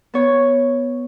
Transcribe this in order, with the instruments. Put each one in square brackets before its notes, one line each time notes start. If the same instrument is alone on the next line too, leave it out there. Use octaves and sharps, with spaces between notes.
[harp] B3 C#5